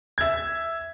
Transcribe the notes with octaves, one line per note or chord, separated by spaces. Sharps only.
E5 G#6